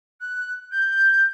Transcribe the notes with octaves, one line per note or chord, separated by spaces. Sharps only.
F#6
G6